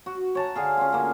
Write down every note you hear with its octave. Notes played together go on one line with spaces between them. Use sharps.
F#4
C#5 A5 A#5
D3 G#4 F5
C#4 F4
D3 A#3